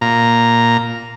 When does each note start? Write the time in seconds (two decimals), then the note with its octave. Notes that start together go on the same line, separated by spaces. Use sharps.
0.01 A#2 A#5